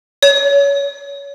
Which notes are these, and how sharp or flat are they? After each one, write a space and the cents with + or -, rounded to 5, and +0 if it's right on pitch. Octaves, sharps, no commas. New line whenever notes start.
C#5 +25